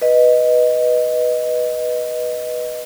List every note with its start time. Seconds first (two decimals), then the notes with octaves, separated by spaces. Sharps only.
0.01 B4 D#5